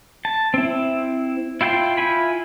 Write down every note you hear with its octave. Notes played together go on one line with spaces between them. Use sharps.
A5
C4 E4
E4 F4 G5 A5 C6
E4 F4 G#5 B5